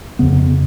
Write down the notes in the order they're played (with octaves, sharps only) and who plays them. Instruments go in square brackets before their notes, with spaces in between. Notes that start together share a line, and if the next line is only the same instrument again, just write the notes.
[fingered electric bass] F2 C#3 B3